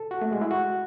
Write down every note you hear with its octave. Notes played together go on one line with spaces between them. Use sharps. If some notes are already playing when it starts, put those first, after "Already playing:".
Already playing: A4
F#4
A3
G#3
E4
F#4